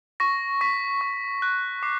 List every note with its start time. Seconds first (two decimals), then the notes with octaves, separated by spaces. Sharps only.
0.20 C#6 A#6
0.61 C#6 B6
1.01 C#6
1.42 F#6
1.83 D6 C7